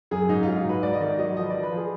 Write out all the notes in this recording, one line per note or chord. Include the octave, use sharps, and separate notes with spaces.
F#2 G#4
G#2 D#4
F#3 F4
D#4
G#2 B4
G#2 D5
D#5
D#3 D5
F#3 D#5
F3 D#5
B4
F3 D5
B4
F3 G#4